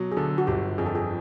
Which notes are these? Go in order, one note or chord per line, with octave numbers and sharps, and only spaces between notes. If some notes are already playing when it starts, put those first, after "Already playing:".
Already playing: B2 F#3
G#4
D3 A4
F#4
G1 G4
F2 G#4
A4
G#4